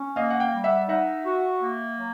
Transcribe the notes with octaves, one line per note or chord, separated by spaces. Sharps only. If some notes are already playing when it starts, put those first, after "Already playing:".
Already playing: C#4
A#3 D#5 F5
F#5
F5 G5
G3
E5 F#5
D#4 E5 F#5
F#4
A#3
F#3